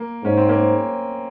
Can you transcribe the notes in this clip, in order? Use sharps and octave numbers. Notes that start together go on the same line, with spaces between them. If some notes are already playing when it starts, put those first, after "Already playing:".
Already playing: A#3
G#2 C#4
C4
A#3 C#4